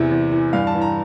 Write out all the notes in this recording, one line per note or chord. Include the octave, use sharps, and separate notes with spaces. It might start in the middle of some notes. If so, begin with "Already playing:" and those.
Already playing: E2 C3 E3 E5
E2
E3
G2 F5
A5
E3
A#5